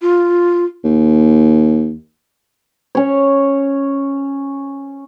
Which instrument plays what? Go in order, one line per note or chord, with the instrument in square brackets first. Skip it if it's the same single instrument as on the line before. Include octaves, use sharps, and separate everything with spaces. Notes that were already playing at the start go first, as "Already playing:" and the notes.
[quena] F4
[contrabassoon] D#2
[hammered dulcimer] C#4 C#5